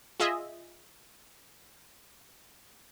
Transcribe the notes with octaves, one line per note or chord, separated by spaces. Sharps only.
F4 G#4 D#5 E5